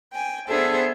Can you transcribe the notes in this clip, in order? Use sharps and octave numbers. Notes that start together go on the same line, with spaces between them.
G5 G#5
B3 D4 G#4 A4 C5 E5